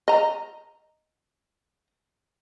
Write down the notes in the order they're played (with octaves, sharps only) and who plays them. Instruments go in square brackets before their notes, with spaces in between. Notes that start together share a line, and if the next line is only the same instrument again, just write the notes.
[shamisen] D#5 A#5